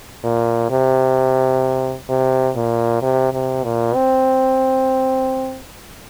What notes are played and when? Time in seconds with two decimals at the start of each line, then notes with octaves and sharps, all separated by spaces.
0.24 A#2
0.70 C3
2.09 C3
2.56 A#2
3.02 C3
3.33 C3
3.64 A#2
3.95 C4